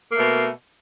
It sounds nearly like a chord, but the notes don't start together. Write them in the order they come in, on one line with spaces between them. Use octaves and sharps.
A#3 A3 B2